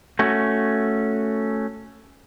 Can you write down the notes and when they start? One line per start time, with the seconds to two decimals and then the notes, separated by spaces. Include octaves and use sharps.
0.19 A3 C#4 F#4